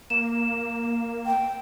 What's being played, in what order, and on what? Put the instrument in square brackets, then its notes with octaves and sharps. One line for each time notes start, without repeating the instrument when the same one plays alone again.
[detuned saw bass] A#3 [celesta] E7
[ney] G5